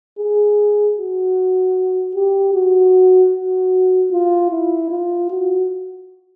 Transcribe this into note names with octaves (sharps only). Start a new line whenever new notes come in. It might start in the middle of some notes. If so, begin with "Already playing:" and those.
G#4
F#4
G4
F#4
F#4
F4
E4
F4
F#4